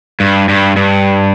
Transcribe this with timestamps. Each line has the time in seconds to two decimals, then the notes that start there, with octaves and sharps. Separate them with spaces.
0.20 G2
0.49 G2
0.76 G2